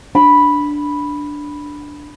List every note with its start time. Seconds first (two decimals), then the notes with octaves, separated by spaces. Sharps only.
0.15 D4 B5